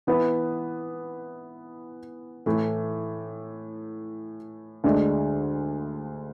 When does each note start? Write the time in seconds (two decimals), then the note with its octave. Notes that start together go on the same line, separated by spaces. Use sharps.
0.07 E3 B3 E4 B4
2.46 A2 E3 A3
4.84 D2 D3 G#3 D4